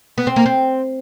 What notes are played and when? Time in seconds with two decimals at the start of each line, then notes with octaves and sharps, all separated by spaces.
0.18 B3
0.27 C4
0.36 A#3
0.46 C4